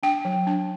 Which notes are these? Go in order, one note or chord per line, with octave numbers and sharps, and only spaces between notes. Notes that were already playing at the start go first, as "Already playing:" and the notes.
D4 G5
F#3
D4